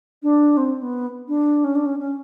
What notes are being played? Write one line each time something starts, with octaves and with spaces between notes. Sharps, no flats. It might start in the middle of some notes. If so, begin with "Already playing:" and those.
D4
C4
B3
D4
C#4
D4
C#4
C#4